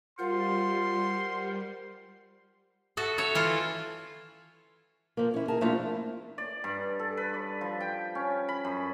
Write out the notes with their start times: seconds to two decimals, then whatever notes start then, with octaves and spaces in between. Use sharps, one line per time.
0.19 G3 F4 A#4 C5 F#5 C6
2.97 F#4 A4 E5
3.18 A4 C#5 E5
3.35 E3 E4 F4
5.17 F3 A#3
5.34 C#4 E4
5.48 G#4 A#4 A5
5.61 F3 A3 A#3 D4 E4 F4
6.38 D5
6.64 G2
6.99 A4
7.17 B4
7.34 D5
7.61 F3
7.80 G5
8.15 C#4
8.49 B5
8.65 F#2